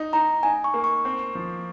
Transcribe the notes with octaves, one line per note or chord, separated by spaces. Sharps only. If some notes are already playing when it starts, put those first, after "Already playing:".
Already playing: D#4
D#4 A#5
D#4 G#5
C#6
A#3
C#6
C4
F3